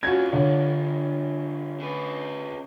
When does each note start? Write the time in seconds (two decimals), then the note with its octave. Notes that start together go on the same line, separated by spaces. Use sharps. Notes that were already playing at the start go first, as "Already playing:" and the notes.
0.03 G2 C#4 F4 F#4 G#6
0.33 D3 C#5
1.80 C#3 B4